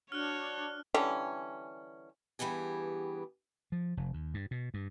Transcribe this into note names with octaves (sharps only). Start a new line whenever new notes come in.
D4 F#4 C#5 F6 F#6
D3 E3 G3 C#4
G2 E3 B3 G4 G#4
F3
F1
D#2
G2
B2
G2